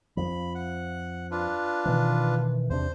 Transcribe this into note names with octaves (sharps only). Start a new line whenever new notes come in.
F2 F3 B5
F#5
D4 F4 B4
B2 D#3 E3
E2 C3 D4 C5